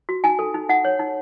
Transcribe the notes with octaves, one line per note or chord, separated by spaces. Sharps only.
F#4
D#4 G#5
A4
D#4
D#4 F#5
C#5
D#4